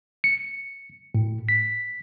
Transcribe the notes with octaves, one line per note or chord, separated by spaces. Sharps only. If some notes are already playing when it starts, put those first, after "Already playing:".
C#7
A2
B6